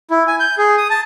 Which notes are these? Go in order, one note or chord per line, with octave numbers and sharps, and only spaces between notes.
E4
G#5
G6
G#4
D#6
A5